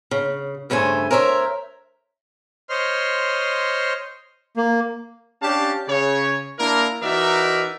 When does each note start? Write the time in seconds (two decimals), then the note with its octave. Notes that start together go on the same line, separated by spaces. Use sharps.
0.11 C#3
0.70 G2 C#3 A3 C5 G#5
1.11 A#4 C5 C#5 D#5 E5
2.69 C5 C#5 D#5 C6 F6
4.57 A#3
5.42 C#4 D4 G4 F5 A5
5.88 C#3 C#5
6.58 A#3 D4 E4 A#4
7.03 E3 D#4 F#4 A#4 D5 E5